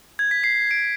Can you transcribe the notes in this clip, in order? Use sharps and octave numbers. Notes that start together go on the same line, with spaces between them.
G#6
B6
C7
D7